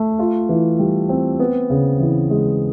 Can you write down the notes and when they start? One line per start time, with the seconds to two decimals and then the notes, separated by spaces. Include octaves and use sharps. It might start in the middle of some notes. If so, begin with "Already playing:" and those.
Already playing: A3
0.19 F4
0.49 E3
0.79 G3
1.09 C4
1.40 B3
1.70 C#3
2.00 E3
2.30 G#3